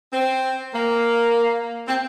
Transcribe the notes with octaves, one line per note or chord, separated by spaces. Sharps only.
C4
A#3
C4